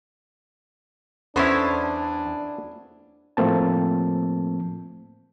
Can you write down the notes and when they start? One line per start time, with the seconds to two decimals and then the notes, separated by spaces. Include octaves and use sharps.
1.36 E2 B3 C#4 D4 E4 A4 C5
3.37 A2 F3 A3 A#3 C4 A5